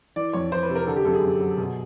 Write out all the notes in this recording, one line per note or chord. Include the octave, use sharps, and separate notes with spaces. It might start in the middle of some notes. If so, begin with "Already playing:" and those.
E3 D5
F2 C#5
E3 C5
B4
C3
A#4
D3 A4
G4
F#2 A4
G#4
F#2
F#3
B2